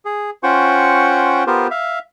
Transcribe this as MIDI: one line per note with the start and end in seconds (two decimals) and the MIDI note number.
0.05 0.30 68
0.43 1.44 61
0.43 1.44 65
0.43 1.44 72
0.43 1.44 78
0.43 1.44 79
0.43 1.44 85
1.47 1.67 59
1.47 1.67 65
1.47 1.67 67
1.47 1.67 70
1.47 1.67 72
1.70 1.99 76
1.70 1.99 77